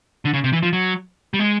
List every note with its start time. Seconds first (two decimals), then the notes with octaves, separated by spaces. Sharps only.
0.25 D3
0.33 C#3
0.44 C3
0.53 E3
0.63 F3
0.73 F#3
1.34 G3
1.39 G#3